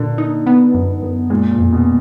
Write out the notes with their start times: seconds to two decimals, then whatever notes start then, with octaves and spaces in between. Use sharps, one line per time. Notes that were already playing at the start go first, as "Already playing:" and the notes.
Already playing: A#2 D3 A#3
0.18 D#4
0.46 B3
0.74 F#2
1.02 F#2
1.30 A#2 G#3
1.51 A#2
1.58 F2
1.72 B2